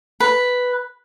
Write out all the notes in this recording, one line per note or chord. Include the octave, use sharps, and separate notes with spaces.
B4